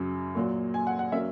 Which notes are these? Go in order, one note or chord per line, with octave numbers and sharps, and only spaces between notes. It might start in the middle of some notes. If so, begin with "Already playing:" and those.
Already playing: F#2 C#3 F#3 C#4
A#2 F#3 A#3
G#5
F#5
F#5
F#3 A#3 C#4 E5